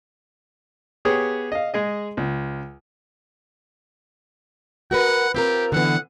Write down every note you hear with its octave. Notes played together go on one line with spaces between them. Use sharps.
B3 G4 G#4 C#5
D#5 F5
G#3 G#4 D#5
C#2
F#4 A#4 B4 F#5
C4 F4 G4 A#4
D3 E3 B3 F#5